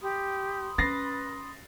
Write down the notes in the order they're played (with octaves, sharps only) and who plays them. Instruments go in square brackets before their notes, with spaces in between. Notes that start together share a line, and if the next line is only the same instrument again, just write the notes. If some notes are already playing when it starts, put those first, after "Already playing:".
[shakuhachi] G4 [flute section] B5 C6 D#6
[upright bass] C#4 [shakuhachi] B4 [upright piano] A6 A#6 C7